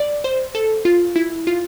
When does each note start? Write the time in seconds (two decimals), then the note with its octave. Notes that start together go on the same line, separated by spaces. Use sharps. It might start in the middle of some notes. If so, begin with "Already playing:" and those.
Already playing: D5
0.24 C5
0.55 A4
0.85 F4
1.16 E4
1.47 F4